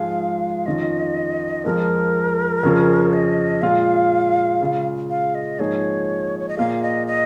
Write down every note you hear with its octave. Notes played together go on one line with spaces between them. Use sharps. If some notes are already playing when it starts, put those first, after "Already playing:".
Already playing: G#2 F3 G#3 F4 G#4 F5
F2 D#3 C#4 F4 D#5
F2 F3 G#3 A#4
F2 C#3 F3 C#4 G#4
D#5
A#2 G#3 F4 F5
C#3 G#3 F4
F5
D#5
G#2 F3 A#3 D#4 G#4 C#5
C#5
D#5
A#2 A#3 F4 G#4 F5
D#5
D#5